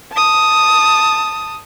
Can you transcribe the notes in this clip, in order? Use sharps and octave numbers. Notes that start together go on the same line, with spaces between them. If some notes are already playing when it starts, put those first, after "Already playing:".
A5 D#6